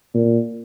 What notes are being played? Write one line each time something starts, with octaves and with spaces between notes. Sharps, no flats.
A#2